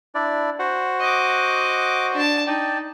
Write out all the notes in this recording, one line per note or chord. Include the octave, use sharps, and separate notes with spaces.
D4 E4 D5
F#4 C5 F#5
D#5 D6
D4 A5
D#4 D5 G5 A5